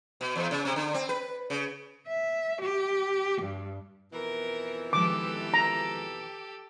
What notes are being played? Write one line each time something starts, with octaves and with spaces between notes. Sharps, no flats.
B2
E2
C#3
C3
D3
C4
B4
C#3
E5
G4
G2
F2 B2 E3 A#4
D#3 F3 G#3 G4 A4 D6
A#5